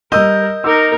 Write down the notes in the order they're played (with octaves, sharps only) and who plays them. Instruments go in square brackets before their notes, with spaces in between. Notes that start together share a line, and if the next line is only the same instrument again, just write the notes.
[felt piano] G3 E6 G6 [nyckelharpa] A#4 [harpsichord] D#5
[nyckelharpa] D#4 A#4 [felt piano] D6 E6